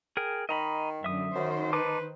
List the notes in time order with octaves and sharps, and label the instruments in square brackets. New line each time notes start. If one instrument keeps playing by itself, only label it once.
[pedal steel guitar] G#4 A#4 G5
[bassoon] D#3 [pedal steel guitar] D#5 A#5 B5
[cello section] F#2 D3 [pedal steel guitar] E5 D#6
[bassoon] F#2 [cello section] D#3 C5
[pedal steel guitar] D#4 A5 D6 [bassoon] B4